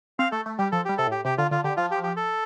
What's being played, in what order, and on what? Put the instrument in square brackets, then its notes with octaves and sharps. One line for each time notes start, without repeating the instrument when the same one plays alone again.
[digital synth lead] C4 [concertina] F5
[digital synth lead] A3 [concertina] A4
[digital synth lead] A3
[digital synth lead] G3 [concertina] G4
[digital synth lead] F3 [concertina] A4
[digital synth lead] G3 [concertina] G4
[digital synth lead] C3 [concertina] A4
[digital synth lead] A2
[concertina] G4
[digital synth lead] C3 [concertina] G4
[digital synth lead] D3 [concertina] F4
[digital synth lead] D3 [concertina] F4
[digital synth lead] D3 [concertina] G4
[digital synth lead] F3 [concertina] F4
[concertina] G4
G4
A4